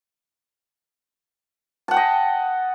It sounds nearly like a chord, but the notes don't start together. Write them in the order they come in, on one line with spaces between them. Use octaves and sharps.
A5 F#5 G5 D#5